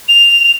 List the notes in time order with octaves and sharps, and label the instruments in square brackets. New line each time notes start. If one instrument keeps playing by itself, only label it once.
[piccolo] F7